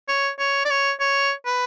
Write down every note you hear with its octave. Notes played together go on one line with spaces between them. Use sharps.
C#5
C#5
D5
C#5
C#5
B4